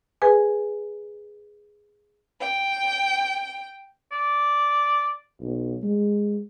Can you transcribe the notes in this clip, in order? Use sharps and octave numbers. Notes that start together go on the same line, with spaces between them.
G#4 B4 G#5
G5
D5
B1
G#3